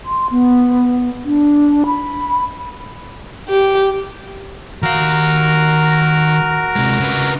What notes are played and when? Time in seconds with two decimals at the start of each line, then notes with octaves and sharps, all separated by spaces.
0.05 C6
0.30 B3
1.25 D4
1.86 B5
3.49 G4
4.82 D#3 F#4 A#4 F5 A#5
6.76 C3 G#3
7.00 C#3 B4